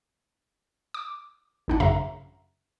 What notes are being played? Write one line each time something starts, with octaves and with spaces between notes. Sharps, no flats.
D6
A1 D4 F#5
F#2 C#3 E5 A#5